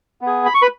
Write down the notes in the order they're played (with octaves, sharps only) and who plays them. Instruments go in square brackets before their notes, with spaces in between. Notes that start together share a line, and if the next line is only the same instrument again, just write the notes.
[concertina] B3
G#4
B5
C#6
B4 B5